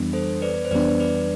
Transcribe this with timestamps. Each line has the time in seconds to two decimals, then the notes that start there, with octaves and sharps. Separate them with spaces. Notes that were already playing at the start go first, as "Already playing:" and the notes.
Already playing: F2 E3 G3 B3 D4
0.13 A4 C5
0.42 B4 D5
0.65 C5
0.71 F2 E3 G3 B3 D4 B4 D5
1.00 B4 D5